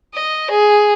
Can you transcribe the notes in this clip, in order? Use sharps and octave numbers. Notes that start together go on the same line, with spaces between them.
D#5
G#4